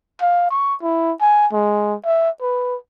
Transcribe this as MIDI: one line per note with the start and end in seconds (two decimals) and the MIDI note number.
0.22 0.48 77
0.51 0.75 85
0.82 1.12 64
1.21 1.47 80
1.53 1.95 56
2.05 2.30 76
2.42 2.76 71